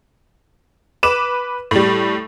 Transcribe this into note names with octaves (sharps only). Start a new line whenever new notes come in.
B4 D6 E7
A2 G3